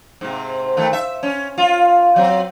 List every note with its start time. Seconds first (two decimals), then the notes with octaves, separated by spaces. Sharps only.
0.21 G#2 C3
0.77 D#3 A3
0.93 E5
1.23 C#4
1.58 F4
2.16 F#3 C4